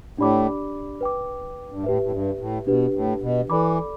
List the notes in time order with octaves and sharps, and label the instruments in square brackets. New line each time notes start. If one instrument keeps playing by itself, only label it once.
[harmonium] A2 [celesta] D4 G4 D5 B5 D6
[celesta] B4 G5 D6
[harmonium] G2
[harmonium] A2 [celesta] G4 B4 E5
[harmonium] A2
G2
A2
[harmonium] B2 [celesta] D4 G4 B4
[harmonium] A2
B2
[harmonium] E3 [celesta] A4 D5 B5 D6